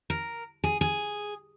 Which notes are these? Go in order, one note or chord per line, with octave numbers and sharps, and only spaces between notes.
A#4
G#4
G#4